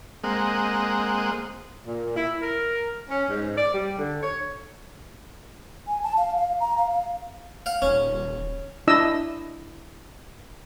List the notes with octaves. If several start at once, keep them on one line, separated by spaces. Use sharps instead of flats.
G#3 A#3 C4 D#5 F#5
A#2
E4
A#4
C#4
G#2
D5
G3
D3
C#5
G#5
A5
F5
F5
A#5
F5
F5
F5 F#5
D#1 C#4
D4 E4 D#5 E6